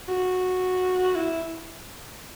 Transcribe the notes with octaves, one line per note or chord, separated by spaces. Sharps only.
F#4
E4